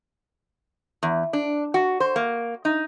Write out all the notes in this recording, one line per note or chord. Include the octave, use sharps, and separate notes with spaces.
E2
D4
F#4
C5
A#3
D#4